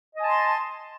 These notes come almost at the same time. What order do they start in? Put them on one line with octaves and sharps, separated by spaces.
D#5 G#5 A5 C6